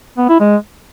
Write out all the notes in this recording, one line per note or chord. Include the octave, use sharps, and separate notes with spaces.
B3
E4
G#3